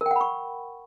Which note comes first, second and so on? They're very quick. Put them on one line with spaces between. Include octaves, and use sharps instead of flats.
A#4 G5 F#5 B5 C#6